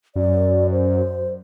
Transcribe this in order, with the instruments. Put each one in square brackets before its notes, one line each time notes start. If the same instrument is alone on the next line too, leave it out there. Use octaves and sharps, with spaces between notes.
[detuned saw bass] F#2 [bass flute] D5
[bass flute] C5